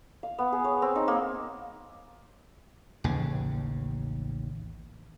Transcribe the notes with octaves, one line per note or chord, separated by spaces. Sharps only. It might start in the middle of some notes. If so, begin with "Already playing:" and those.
F5
B3
G#4
C#5
C4
D#4
A#3
A1 D#2 C#3